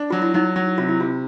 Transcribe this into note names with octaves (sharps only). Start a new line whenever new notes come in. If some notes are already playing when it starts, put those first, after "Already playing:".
Already playing: D4
F#3 F4
E4
F#3 D#4
F#3
C3 F4
E4
C3 F4